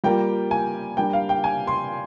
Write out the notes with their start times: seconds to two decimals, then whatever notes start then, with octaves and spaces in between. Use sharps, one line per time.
0.04 G3 A#3 F4 G5
0.51 G#5
0.97 G3 A#3 D4 G5
1.13 F5
1.29 G5
1.44 G#5
1.67 C6